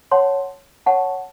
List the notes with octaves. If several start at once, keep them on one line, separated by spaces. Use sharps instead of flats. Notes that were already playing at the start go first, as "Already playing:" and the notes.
C#5 F#5 A5 C6
C#5 F#5 A5 C#6